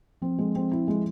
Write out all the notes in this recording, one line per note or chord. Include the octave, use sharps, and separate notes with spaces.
F3 C4
G#3
C4
E4
G#3